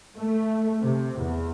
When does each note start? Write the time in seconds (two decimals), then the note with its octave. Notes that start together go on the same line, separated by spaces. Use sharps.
0.17 A3
0.82 C3
1.20 E2